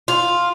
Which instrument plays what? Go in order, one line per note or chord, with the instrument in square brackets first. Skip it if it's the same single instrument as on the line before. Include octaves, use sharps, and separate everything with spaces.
[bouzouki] F4